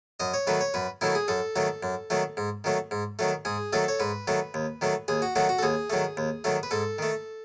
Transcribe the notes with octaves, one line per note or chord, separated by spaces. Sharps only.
F#2 D#5
C#5
D#3 F#3 A3 B4
C#5
F#2 B4
D#3 F#3 A3 E4
G#4
F#2 A4
D#3 F#3 A3
F#2
D#3 F#3 A3
G#2
D#3 F#3 A3
G#2
D#3 F#3 A3
G#2 G#4
D#3 F#3 A3 A4
C#5
G#2 B4
D#3 F#3 A3
D#2
D#3 F#3 A3
D#2 G#4
F#4
D#3 F#3 A3 F#4
F#4
A4
D#2 G#4
D#3 F#3 A3
D#2
D#3 F#3 A3
B4
G#2 A4
D#3 A3